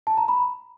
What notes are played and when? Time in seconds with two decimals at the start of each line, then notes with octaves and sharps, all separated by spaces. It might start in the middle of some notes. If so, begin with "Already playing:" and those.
0.07 A5
0.17 A#5
0.28 B5